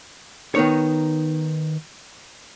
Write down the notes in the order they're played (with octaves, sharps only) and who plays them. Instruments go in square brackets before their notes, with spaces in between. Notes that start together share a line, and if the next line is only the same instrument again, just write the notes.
[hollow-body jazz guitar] D#3 B3 D#4 C#5